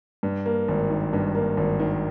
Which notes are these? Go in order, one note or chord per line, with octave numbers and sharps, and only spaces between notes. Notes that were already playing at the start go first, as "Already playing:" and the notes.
G2
A#3
G#1
D#3
G2
A#3
G#1
D#3